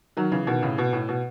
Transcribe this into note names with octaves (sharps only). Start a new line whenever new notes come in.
D#3 F#3
C#3 E3
B2 D#3
A2 C#3
B2
A2
B2